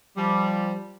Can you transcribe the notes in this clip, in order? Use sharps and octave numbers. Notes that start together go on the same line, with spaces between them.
F3 G3